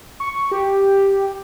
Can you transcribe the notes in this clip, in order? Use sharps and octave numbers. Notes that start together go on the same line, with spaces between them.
C#6
G4